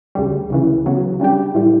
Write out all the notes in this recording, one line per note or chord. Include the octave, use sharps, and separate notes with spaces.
D2 C#3 G3
D2 C#3 E3
C#2 C#3 F#3 B3
C#3 G3 D4 G4
A2 E3 G3